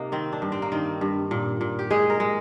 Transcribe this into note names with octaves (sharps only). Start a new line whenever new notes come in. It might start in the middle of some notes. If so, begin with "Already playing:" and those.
Already playing: C3 A#3 D#4
D#3 C4
D4
G2
C4
A#3
D#3 C4
G2
A#2
A#2
G4
G#3 G#4
A#4
G#3